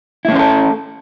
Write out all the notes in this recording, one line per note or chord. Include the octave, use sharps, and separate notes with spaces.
A3 C#4 E4 A4 C5